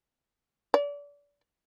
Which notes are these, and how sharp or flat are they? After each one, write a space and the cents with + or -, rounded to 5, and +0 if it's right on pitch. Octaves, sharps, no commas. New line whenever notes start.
D5 -30